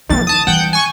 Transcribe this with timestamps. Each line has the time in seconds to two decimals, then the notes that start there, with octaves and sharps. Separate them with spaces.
0.09 B1 D#3 E4 A6
0.27 A5 D#6
0.47 E3 G3 F#5 G5 G6
0.73 G#5 C#6